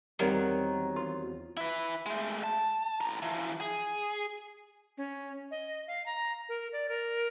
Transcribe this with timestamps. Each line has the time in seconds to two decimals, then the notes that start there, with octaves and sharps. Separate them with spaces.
0.19 E2 D#3 F#3 G3 C4 A#4 F#5
0.96 F4
1.57 E4 B4
2.06 G#3 A3
2.44 A5
3.01 A2 A#5
3.22 E3 F3
3.61 G#4
4.97 C#4
5.51 D#5
5.87 F5
6.06 A#5
6.49 A#4
6.72 D5
6.89 A#4